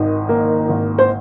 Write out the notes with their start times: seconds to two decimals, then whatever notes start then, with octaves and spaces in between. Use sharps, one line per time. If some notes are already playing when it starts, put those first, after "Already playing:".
Already playing: G#1 D#3 D#5
0.29 A#3
0.69 G#1
0.98 C5